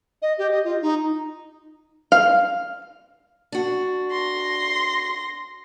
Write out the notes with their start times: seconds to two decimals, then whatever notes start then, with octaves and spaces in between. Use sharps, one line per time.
0.22 D#5
0.38 G4
0.51 D#5
0.64 F4
0.82 D#4
2.12 F5
3.52 D4 F#4
4.11 C6 A#6